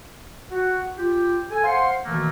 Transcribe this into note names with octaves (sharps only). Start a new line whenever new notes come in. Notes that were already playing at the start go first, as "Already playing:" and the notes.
F#4 F#5
F4 G4
A4 G#5
C5 F5 F#5 C6
B2 D#3 E3 A3 A#3